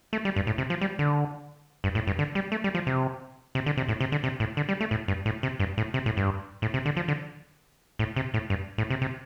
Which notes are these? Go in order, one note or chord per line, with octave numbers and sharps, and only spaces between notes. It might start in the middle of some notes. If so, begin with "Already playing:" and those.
A3
G3
G2
A2
C3
F3
G3
D3
G2
A2
G2
D3
G3
A3
G3
F3
C3
C3
D3
C3
A2
C3
D3
C3
A2
D3
G3
A3
A2
G2
A2
C3
G2
A2
C3
A2
G2
A2
C3
D3
F3
D3
A2
C3
A2
G2
A2
C3
C3